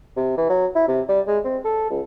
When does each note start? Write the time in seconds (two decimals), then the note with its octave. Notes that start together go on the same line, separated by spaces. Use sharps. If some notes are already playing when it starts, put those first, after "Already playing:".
0.17 C3
0.37 E3
0.49 F#3
0.76 E4
0.88 C3
1.09 G3
1.27 G#3
1.45 C4
1.65 A4
1.90 C#2